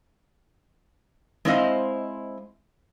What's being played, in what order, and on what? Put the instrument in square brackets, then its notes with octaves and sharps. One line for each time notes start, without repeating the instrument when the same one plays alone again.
[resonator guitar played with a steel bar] G#3 C4 E4 C5 D#5 F5